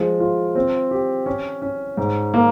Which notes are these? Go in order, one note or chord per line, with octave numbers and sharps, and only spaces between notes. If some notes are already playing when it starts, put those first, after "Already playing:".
Already playing: F3 G#3
F4
C4
G4
C#4
C#4
G#2
A#3